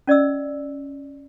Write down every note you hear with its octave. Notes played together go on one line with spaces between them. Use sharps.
C#4 D5 D#5 E6